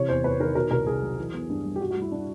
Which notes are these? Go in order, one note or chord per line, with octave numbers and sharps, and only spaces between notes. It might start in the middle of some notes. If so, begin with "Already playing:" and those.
Already playing: C3 E3 C#5
E2 C5
E2 B4
D#3 A#4
B2 A#4
C2 A#4
C2 G#4
F#3
E3
B3
G2
G3
G4
G2 F#4
F#4
G3
E4
D4